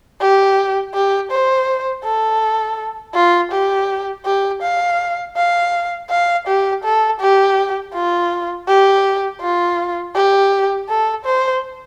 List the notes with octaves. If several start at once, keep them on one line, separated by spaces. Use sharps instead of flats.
G4
G4
C5
A4
F4
G4
G4
F5
F5
F5
G4
A4
G4
F4
G4
F4
G4
A4
C5